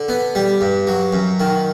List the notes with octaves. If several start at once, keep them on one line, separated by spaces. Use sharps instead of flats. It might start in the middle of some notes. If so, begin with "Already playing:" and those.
Already playing: D3
B3
G3
G2
F#3
F#2
D#3